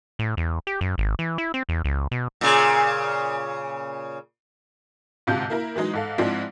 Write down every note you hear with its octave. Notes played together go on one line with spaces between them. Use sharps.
A2
E2
G4
F#2
G#1
E3
E4
C4
E2
C#2
B2
A#2 C#3
D2 G#2 C3 F4 A5 G6
A#3 E4 A#4
E3 F#3 G#3 D#4
G#2 A4 F5
G#2 F3 G#3 C4 D4 E4